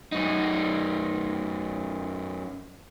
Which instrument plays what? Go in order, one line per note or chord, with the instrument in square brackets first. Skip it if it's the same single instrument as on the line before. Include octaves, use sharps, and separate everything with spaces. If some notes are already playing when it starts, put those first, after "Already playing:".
[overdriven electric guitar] F#2 D#4